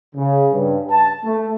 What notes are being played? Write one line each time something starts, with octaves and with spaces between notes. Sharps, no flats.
C#3
G2
A5
A3